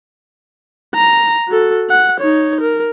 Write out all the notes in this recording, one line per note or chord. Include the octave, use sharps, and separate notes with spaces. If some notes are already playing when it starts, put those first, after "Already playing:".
A#5
F#4 A4
F#5
D#4 C#5
A#4